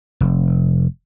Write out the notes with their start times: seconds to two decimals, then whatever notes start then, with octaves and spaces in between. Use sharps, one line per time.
0.21 F1